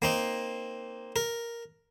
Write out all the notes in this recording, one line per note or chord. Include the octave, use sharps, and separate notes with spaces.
A#3 C4 D#4
A#4